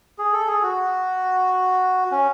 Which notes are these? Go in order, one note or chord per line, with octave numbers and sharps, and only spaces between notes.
G#4
A4
G#4
F#4
C#4